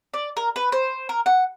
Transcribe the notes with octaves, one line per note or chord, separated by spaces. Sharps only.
D5
A#4
B4
C5
A#4
F#5